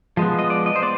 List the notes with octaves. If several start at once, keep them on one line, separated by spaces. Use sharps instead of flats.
F3 G#3 B3
D#5
D5
D#5
C5
B3 D5